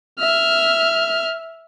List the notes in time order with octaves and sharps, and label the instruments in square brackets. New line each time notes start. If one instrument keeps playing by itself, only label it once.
[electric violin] E5 F6